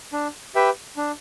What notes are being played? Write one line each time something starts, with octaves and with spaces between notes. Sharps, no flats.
D4
G4 B4 E5 G5
D4